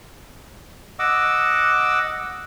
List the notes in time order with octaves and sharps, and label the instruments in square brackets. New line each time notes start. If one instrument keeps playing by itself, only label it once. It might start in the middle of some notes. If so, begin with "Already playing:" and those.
[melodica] D#5 F#5 D6 E6